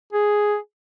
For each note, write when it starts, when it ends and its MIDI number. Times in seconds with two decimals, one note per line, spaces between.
0.13 0.56 68